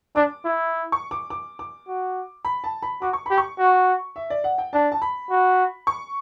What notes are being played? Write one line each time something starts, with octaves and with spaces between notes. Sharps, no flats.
D4 D6
E4
C#6
D6
D6
D6
F#4
B5
A5
B5
F#4 D6
C#6
G4 B5
C#6
F#4
E5
D5
F#5
G5
D4 A5
A5
B5
F#4
C#6